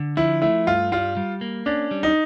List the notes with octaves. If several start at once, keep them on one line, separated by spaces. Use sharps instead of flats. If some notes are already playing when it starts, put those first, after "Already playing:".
Already playing: D3
F3 E4
A3 E4
G2 F4
G3 F4
G3
A#3
C#4 D4
G3
D#4